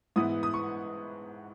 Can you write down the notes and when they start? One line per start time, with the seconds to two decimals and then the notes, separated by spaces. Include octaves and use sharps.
0.16 G#2 E3 B3 E4 D#6
0.43 D#6
0.54 C#6